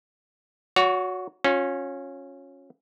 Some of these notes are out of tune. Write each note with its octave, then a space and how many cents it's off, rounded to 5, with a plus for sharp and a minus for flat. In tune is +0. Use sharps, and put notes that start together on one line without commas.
F#4 -15 C#5 +30
C#4 -10 F4 +45